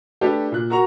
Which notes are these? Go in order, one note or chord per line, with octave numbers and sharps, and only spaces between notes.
A3 D4 G4 A4 B4
A#2 F#6
F#4 A#4 A#5 C#6 F7